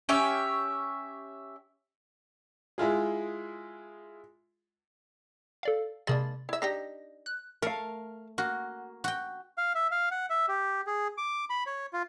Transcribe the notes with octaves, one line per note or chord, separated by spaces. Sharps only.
C#4 G4 C#5 E5
G#3 E4 F4 G#4
A4 D5 F5
C3 G#3 A#3 D4 B5 A6
E4 E5
D4 D#4 G4 A#6
F#6
A3 A#4 F5
A#3 F#4
F#4 G5
F5
E5
F5
F#5
E5
G4
G#4
D6
B5
C#5
F4